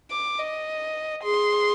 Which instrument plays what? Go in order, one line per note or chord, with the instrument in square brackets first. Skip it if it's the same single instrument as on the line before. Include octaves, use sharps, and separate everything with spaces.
[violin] D6
D#5
[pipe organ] G#4 [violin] C6